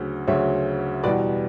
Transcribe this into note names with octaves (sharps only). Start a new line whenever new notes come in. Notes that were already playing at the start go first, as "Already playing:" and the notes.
Already playing: D2 C#3 F#3
D2 C#3 F#3 C#5 E5
E2 B2 G3 B4 D5